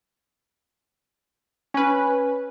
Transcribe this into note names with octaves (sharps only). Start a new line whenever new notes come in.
C#4 B4